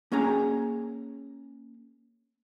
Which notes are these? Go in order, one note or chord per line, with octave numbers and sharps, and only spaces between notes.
A#3 C#4 G#4 A#5